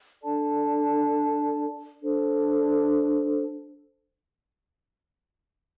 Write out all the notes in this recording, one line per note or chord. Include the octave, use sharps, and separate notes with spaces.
D4 A4 D5 A5
D4 A4 C5